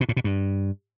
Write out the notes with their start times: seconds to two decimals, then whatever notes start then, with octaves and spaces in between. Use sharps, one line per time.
0.01 B2
0.09 A2
0.16 B2
0.24 G2